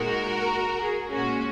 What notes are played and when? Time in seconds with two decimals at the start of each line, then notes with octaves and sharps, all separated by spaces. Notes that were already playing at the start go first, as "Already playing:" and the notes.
Already playing: A#2 G#3 D#4 F#4 A#4
0.79 G#4
1.12 A#2 G#3 C#4 F#4